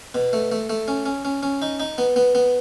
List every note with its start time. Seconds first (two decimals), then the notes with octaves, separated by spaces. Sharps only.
0.15 B2
0.33 A3
0.52 A3
0.70 A3
0.88 C#4
1.06 C#4
1.25 C#4
1.43 C#4
1.62 D#4
1.80 D#4
1.98 B3
2.16 B3
2.35 B3